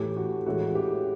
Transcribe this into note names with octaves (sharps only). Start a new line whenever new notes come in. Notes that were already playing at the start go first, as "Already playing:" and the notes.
Already playing: A2 E3 A3 G4
F#4
A2 E3 G#3 F#4
G4